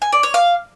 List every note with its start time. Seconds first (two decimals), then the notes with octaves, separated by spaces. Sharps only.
0.02 G#5
0.12 D5
0.23 C#5
0.34 F5